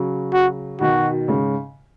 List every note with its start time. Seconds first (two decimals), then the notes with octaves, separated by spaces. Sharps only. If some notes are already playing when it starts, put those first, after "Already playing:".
Already playing: C#3 F#3
0.33 F#4
0.80 B2 D#3 F#4
1.28 G#2 C#3